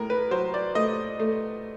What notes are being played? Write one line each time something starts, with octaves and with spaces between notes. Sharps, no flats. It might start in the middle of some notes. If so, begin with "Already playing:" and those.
Already playing: A2 A#4
B4
F#3 C5
D5
A3 D#5
A3